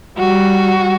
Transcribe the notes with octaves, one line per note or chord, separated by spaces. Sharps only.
G3 F#4